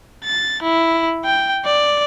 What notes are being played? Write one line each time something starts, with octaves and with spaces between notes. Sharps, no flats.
A6
E4
G5
D5